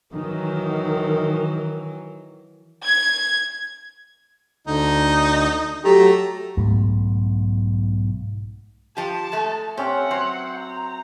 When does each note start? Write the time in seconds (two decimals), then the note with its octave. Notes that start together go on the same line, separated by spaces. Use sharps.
0.15 D#3 E3 F#3
2.83 G#6
4.67 D2 D3 D#4
5.85 F#3 A3 G4 A#5
6.57 B1 G#2 A3
8.97 F3 G4 A5
9.32 G#3 A3
9.77 C4 C#4 G4 E5 F#5
10.11 F#3 C5
10.58 A#5